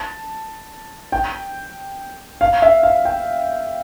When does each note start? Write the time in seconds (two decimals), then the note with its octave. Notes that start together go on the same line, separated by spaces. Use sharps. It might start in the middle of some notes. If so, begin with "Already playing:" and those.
Already playing: A5
1.12 G5
2.41 F5
2.62 E5
2.83 F5
3.05 G5